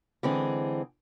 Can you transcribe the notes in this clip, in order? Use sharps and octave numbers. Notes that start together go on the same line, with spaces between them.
D3 E3 G#3 C4 G#4